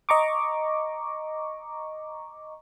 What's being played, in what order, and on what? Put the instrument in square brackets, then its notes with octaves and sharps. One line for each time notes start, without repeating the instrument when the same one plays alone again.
[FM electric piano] D#5 A#5 C#6 D6